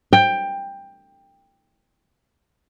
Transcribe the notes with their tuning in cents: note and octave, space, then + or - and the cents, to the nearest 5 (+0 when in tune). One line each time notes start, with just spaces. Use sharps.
G5 +15